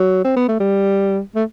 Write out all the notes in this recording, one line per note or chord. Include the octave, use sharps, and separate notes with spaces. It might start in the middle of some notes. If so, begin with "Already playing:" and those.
Already playing: F#3
C4
B3
A3
G3
A3